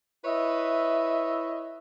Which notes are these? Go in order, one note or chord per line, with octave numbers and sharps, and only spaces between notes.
E4 B4 C#5 D#5 E5